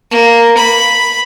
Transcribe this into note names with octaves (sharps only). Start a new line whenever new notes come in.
A#3
B5